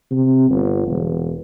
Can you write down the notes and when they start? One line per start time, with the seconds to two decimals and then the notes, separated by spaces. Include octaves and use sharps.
0.11 C3
0.49 G1
0.87 E1